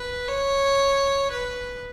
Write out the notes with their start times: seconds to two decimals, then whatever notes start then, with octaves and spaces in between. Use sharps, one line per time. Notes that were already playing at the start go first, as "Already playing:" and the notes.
Already playing: B4
0.28 C#5
1.32 B4